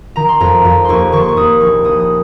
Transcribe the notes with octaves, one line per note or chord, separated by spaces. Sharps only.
D#3 A#5
C6
F2 A#5
F2
D#2 C6 C#6
D#3 C#6
C6
C#6
D#2 D#6
A#1 C#6
A#1 D#6
D#6